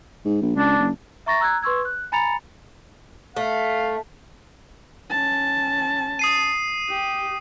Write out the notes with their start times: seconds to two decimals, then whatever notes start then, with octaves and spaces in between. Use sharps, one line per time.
0.25 G#2
0.42 A#1
0.56 C#2 D4
0.78 F#1
1.26 E5 A#5 C#6 A6 A#6
1.40 A#5 E6 F#6 G#6
1.62 B4 C6 C#6 E6 G#6
1.85 F#6
2.12 G#5 A#5 B5 A6 C#7 F7
3.36 A3 F5
5.10 C#4 A5
6.19 D#6 C7 D#7
6.89 G4